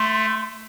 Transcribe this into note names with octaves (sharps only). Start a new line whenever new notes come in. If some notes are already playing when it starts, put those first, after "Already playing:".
Already playing: A3 C6